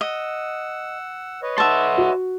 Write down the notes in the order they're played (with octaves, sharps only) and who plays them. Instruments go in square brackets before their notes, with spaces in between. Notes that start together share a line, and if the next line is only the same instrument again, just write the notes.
[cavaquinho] D#5 [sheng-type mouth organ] F#5 E6
[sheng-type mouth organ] B4 C#5 D#5
[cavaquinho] E5 A5 [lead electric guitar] F#5 C6
[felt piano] F#4